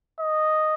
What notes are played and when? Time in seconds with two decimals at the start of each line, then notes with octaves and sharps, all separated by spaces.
0.20 D#5